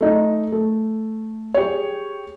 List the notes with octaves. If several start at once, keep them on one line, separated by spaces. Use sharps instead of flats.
A3 D#4
A3
G4 G#4 C#5